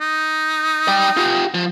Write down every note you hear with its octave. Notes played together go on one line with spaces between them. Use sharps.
D#4
D5 G5
F4 G4
F3